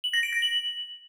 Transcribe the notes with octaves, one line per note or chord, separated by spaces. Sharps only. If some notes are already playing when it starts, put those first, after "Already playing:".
F#7
A#6
D7
A#6
F#7